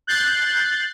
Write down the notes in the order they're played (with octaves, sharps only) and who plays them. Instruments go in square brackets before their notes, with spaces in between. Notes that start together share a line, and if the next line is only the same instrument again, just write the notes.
[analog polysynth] F#6 G6 A6 C7